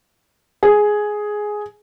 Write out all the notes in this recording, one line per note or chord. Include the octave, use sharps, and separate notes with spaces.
G#4